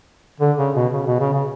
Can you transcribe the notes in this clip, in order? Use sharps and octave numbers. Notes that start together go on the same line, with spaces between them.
D3
C#3
B2
C#3
B2
C#3
C#3